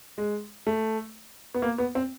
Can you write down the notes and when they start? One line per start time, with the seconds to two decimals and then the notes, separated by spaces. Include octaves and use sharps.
0.18 G#3
0.67 A3
1.54 B3
1.62 A#3
1.78 B3
1.95 C4